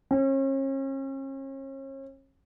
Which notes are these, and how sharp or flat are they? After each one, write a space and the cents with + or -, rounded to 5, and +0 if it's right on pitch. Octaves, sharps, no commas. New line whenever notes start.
C#4 -40